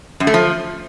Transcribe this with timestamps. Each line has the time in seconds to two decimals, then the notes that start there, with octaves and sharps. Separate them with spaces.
0.20 F#2
0.27 A3
0.34 F3